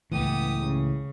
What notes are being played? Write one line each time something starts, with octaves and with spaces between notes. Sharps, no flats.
C#2 A2 E3 B3 G4 D#6
C#3